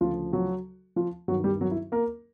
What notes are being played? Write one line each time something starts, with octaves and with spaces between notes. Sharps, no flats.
D2 C#3 F3 F4
F#3 F#4
F3 F4
G2 D#3 F#3 F#4
G3 G4
F#3 F#4
E4
A#3 A#4